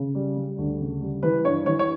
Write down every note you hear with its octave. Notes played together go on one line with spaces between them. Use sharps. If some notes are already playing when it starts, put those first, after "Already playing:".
Already playing: C#3
G3
G3
D2
C#3
G3
E3 B4
G2 C#5
E3 C#5
C#5